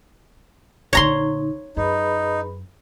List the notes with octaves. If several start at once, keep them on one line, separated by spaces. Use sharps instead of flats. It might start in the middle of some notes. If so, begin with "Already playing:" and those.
A#1 D3 D#4 C#5 A#5 C6
F#2 D#4 G#4 B4 B5